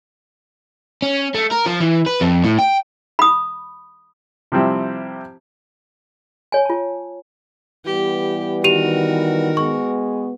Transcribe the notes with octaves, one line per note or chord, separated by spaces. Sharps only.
C#4
A3
A#4
F3
E3
B4
F2
A2
G5
B5 D#6
C3 F3 G3 C4 E4
C#5 G#5
F4 A5
E3 G3 B3 G4
D#3 F#4 G4 A#4 D#7 F7
G#3 B3 C#6